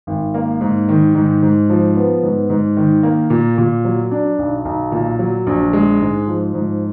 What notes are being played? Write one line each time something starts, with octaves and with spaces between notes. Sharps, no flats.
G#1
A#3
G#2
D#3
G#2
G#2
F3
B3
G#2
G#2
D#3
A#3
A#2
A#2
F#3
D4
B1
B1
A#2
F#3
A#1
G#3
G#2
F3
G#2